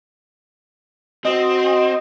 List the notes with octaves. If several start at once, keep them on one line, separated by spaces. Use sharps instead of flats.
C4 F#4 D#5